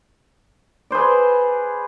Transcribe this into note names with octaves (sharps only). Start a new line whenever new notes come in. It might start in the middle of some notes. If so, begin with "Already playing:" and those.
G#4 B4 C5 D5